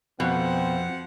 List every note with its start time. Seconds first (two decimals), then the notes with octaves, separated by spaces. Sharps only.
0.20 F2 B2 F3 C4 F#5